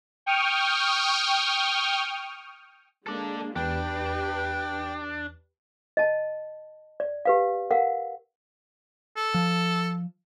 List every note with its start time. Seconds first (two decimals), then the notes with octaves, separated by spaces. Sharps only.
0.26 G5 C#6 D#6 F6
3.07 G#3 A#3 D4 A4 D5
3.56 E2 D4 G4 B4 G5
5.97 D#5 A5
7.00 D5
7.25 G4 B4 F5
7.71 A#4 F5 F#5
9.17 A4
9.34 F3